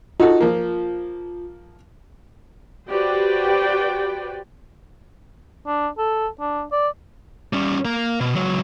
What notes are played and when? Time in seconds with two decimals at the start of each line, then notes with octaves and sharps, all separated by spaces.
0.20 D#4 F4 F#4 A4
0.40 F3 A#3
2.89 F#4 G4 B4 C5 D5 G5
5.67 D4
5.98 A4
6.40 D4
6.72 D5
7.53 G3 C#4
7.85 A#3 A#4
8.20 B2
8.35 C#2 F#3